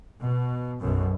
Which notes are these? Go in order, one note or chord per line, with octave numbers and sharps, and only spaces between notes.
B2
B1 F#2 B2